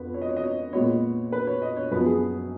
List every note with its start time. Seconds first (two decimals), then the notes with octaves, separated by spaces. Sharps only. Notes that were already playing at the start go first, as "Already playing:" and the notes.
Already playing: F2 B3 B4
0.14 C#5
0.22 D#5
0.29 C#5
0.37 D#5
0.44 C#5
0.73 A#2 G#3 B3 C#5
1.32 B4
1.47 C#5
1.62 D#5
1.77 C#5
1.91 F#2 F3 B3 B4
2.06 G#4